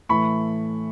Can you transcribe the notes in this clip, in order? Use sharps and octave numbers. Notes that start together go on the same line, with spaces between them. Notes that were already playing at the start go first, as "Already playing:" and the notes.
A2 E3 A3 B5 C#6